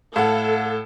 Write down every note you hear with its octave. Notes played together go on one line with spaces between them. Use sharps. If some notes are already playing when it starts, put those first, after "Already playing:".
A2 A4 F5 F#5